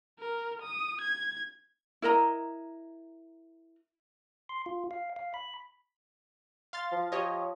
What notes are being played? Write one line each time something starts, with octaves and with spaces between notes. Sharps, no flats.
A#4
D#6
G#6
E4 A#4 D#5 A#5
C6
F4
F5
F5
B5
F5 C6 A6
F3
F3 G4 C#5 D#5